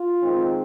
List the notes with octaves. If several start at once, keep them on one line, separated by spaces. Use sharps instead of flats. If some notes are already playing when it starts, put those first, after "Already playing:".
Already playing: F4
D#3 G#3 C4